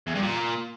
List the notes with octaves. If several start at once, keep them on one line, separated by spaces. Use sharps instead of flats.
E2
G2
A#2